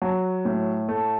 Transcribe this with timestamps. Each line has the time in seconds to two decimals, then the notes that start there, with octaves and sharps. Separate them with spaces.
0.02 F#3
0.45 A2
0.89 A3